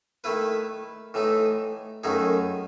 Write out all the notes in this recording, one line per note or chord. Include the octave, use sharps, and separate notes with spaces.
D#3 A3 E4 B4
A2 E3 A3 D#4
F#2 D#3 A3 D#4 G#4